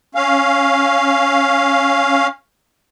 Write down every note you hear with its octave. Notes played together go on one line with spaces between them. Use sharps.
C#4 F5